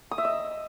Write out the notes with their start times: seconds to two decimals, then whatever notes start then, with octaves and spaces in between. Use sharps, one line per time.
0.11 D#6
0.18 E5
0.25 D#5